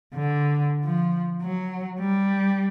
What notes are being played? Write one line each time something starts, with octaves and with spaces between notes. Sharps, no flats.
D3
F3
F#3
G3